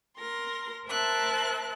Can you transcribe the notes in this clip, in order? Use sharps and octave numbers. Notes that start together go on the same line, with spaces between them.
A#4 C6 A#6
A#4 C5 E5 A5 F#6